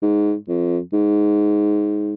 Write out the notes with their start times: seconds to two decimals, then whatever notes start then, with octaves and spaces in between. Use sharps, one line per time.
0.02 G#2
0.48 F2
0.93 G#2